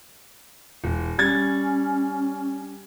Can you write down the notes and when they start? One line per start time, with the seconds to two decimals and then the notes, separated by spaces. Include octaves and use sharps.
0.84 E1
1.18 G3 C#4 G#6 A6